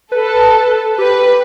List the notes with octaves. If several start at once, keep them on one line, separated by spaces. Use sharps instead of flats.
A4 B4
G4 B4